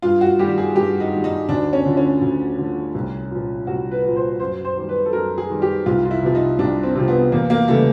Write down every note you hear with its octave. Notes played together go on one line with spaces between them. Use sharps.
G2 F4
F#4
D#3 G3 G4
G#4
G2 G4
D#4
D#3 G3
D#4
D2 D4
C#4
D3 F3
C#4
D2
D3 F3
C2
A#2 F3
C2 F#4
B4
A#2 F3
C5
F#2 C5
C5
D#3 G3
B4
A4
F#2 A#4
G#4
D#3 G3
G4
C2 F4
F4
E4
C3 F3
D#4
C2 D4
C4
C3 F3
B3
E2 A#3
A#3
C#3 E3 G3 A3